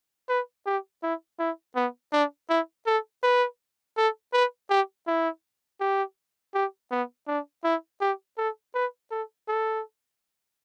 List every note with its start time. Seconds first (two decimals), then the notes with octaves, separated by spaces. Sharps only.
0.29 B4
0.66 G4
1.03 E4
1.39 E4
1.76 B3
2.13 D4
2.49 E4
2.86 A4
3.23 B4
3.97 A4
4.33 B4
4.70 G4
5.07 E4
5.81 G4
6.54 G4
6.91 B3
7.28 D4
7.64 E4
8.01 G4
8.38 A4
8.75 B4
9.11 A4
9.48 A4